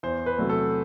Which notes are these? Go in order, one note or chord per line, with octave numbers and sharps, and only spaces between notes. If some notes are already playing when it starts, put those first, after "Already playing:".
E2 C5
B4
C3 F#3 A3
A4